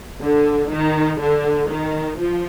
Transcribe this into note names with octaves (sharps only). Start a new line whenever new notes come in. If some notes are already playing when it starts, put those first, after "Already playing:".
D3
D#3
D3
D#3
F3